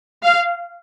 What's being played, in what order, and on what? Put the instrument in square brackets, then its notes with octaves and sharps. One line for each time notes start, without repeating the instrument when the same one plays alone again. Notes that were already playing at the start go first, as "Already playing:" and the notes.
[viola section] F5